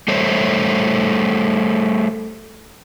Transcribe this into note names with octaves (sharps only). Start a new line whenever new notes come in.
G3 A3 C5 C#5